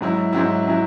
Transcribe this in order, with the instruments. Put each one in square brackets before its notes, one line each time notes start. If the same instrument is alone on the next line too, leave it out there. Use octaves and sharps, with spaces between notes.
[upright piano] G#2 F#3 E4
G#2 F#3 E4
F#3 E4